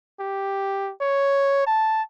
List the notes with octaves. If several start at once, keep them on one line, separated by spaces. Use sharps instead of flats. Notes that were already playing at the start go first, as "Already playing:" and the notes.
G4
C#5
A5